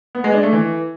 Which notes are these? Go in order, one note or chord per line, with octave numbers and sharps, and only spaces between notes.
B3
G#3
D4
A3
E3